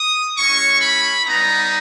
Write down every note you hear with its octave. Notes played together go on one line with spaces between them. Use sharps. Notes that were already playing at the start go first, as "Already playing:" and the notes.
Already playing: D#6
G#3 C#4 E4 C#6
B5
G3 B3 D#4 A#5